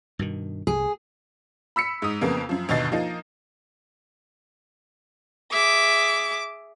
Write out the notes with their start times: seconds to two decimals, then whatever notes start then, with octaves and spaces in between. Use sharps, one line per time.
0.19 G2 B2 D#3
0.67 C2 G#4
1.76 B5 E6 B6 C#7
2.02 G#2 D#6
2.21 F2 C#3 A#3 B3
2.49 F#2 F3
2.69 G1 D#2 B2 D#5 A6 C7
2.92 F3 A#3 D#4
5.52 G#4 E5 D6